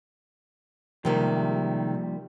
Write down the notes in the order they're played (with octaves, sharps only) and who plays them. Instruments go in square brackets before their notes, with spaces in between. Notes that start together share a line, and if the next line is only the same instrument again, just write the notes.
[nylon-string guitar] C3 D#3 G#3 [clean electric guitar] F3 G3 A#3